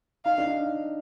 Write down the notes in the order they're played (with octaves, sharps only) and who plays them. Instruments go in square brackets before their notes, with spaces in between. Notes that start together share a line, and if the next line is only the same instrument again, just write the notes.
[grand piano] D#4 [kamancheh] F5
[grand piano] D4
D#4